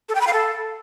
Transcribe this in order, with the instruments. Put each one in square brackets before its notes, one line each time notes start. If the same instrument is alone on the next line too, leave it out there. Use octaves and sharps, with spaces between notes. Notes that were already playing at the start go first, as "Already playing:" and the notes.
[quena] A4
G5
B5
F5
A4